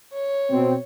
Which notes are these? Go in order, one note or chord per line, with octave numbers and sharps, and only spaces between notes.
C#5
B2 C4